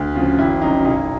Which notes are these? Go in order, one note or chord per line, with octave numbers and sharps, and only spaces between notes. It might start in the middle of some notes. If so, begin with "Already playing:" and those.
Already playing: D2
C#3 F3 F4
G#1 E4
F#2 C#3 D#4
B1 D#4